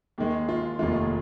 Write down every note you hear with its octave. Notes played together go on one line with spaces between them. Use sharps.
D#2 D#3 G#3
F4
F1 D#2 D#3 G#3 F4